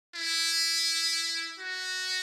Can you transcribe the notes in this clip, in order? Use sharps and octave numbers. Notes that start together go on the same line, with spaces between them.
E4
F#4